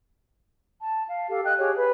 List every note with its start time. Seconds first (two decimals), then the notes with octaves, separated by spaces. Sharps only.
0.81 A5
1.08 F5
1.29 G4 A4 F5
1.44 D#5 G5 F#6
1.58 G4 G#4 C#5
1.75 B4